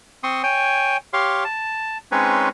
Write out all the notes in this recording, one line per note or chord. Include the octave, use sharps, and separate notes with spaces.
C4 C6 C#6 D#6
C#5 G5 G#5
G4 C#5 F5 C6
A5
G#3 C4 C#4 D#4 B4 C#5